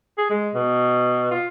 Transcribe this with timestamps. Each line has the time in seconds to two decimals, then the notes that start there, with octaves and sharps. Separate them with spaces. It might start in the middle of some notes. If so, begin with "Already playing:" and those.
0.18 G#4
0.30 G#3
0.54 B2
1.31 F4